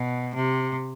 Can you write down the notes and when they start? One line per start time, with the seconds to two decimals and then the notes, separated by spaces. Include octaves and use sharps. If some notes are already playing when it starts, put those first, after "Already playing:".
Already playing: B2
0.35 C3